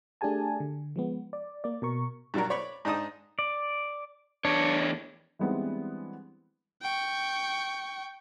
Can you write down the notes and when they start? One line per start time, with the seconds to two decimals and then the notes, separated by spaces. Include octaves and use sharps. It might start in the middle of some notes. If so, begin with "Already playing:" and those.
0.21 A3 D4 G4 G#4 G#5 A5
0.60 D3
0.96 F3 G#3 B3
1.33 D5
1.64 A#3 D5
1.82 B2 A#4 C#6
2.34 G2 B2 F#3 D4 A#4
2.50 C#5 D5 B5 C#6
2.85 G#2 D4 D#4 A5 D#6
3.39 D5
4.45 E2 D4 C#5
5.39 E3 G3 G#3 B3 C4 D4
6.82 G5 C#6